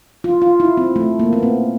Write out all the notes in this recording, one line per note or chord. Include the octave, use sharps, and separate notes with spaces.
F4
F4
E4
C4
A3
A#3
B3
C4